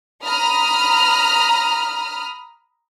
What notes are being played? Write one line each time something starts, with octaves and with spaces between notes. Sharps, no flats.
A#5 B5 D#6 F6